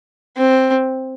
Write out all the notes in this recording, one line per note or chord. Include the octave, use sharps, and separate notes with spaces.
C4